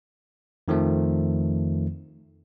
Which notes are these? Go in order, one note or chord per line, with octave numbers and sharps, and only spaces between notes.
F2 D#3 F3 A3